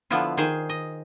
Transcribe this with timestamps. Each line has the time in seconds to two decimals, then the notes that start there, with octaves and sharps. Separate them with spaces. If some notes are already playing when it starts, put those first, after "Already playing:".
0.11 D3 F3 B3 E4 F4
0.37 D#3 G#4 C5
0.69 D#5